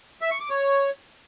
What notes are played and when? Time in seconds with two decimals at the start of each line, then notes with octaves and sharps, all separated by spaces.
0.21 E5
0.31 C#6
0.40 D6
0.50 C#5